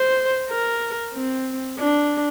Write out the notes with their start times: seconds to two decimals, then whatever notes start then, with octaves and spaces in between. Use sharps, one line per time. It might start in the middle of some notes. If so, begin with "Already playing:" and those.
Already playing: C5
0.49 A#4
1.14 C4
1.78 D4